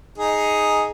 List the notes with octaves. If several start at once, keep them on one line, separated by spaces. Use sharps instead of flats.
D#4 G#4